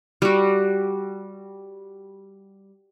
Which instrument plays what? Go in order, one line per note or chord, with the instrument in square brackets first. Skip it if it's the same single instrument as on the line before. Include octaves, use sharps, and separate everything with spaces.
[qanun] G3 F#4